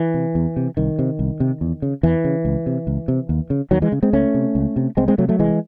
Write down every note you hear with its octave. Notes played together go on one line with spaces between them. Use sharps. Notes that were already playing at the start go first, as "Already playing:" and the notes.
Already playing: E3
C3
E2
C3
C2 D#3
C3
C2
C3
E2
C#3
E2 E3
C#3
C#2
C3
C#2
C3
D#2
C#3
D#2 D#3 F#3
E3 G#3
C#3
G#3 C4
C#2 A3 C#4
C3
C#2
C3
C2 G#3 C4
G#3 C4
C3 F#3 A3
F#3 A3
C2 E3 G#3